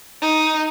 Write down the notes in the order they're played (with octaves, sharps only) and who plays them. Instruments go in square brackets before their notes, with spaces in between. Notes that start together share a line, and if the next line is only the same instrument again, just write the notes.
[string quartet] D#4